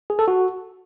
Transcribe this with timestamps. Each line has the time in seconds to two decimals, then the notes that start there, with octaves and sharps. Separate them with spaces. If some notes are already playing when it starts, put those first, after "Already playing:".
0.10 G#4
0.19 A4
0.28 F#4